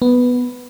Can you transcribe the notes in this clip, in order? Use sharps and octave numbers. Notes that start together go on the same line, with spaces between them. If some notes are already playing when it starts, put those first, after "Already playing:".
B3